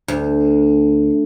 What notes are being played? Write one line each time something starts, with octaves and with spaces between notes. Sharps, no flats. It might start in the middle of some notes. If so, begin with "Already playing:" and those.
D2